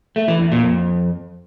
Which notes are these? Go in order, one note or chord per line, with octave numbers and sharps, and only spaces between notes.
A3
E3
E2
A#2
F2